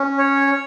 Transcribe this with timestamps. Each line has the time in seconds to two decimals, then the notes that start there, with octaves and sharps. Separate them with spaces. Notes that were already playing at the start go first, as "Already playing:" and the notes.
Already playing: C#4
0.18 C#5